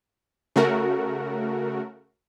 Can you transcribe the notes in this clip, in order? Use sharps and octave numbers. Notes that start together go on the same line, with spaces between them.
C#3 A3 F#4 A#4